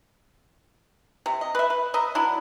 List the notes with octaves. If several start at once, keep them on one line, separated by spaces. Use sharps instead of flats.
C3
D#5
B4 E5
B4
B4 D#5 E5 A#5
F#3 D4 E4